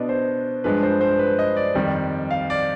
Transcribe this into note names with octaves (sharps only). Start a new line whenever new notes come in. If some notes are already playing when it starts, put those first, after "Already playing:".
Already playing: B2 B3 D4 D5 D#5
C5
G2 F3 G#3 D4 B4
C5
C5
B4
D#5
D5
F2 D#3 G3
F5
D5